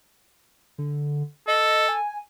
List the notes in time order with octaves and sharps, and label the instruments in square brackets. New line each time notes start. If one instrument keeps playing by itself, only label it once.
[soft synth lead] D3
[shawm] A4 [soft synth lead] D#5
[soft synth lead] G#5